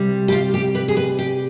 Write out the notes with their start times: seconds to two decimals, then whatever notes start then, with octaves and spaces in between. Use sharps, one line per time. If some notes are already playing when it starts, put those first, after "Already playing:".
Already playing: C3 G3
0.28 G4
0.32 F4
0.54 G4
0.75 B4
0.88 G#4
0.97 B4
1.19 G4